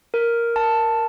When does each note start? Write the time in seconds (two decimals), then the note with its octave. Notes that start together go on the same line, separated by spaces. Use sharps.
0.14 A#4
0.56 A5